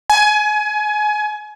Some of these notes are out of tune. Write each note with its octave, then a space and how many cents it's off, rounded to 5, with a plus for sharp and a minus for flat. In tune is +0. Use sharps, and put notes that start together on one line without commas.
G#5 +25